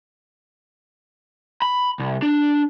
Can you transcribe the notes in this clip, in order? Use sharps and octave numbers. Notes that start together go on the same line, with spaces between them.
B5
C2
D4